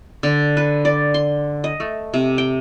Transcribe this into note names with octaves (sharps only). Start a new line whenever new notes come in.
D3
B4
D5
C6
D#5
A3
C3
G5